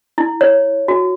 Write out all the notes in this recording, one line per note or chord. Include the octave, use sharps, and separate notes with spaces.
E4
C#5
F#4